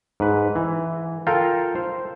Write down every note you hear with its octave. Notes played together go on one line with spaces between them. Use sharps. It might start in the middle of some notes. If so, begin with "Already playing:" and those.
G#2 B4
E3
F4 A4 A#4 F5 G5
C5